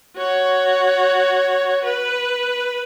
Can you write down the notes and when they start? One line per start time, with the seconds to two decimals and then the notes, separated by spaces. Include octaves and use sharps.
0.17 F#4 C#5
1.85 B4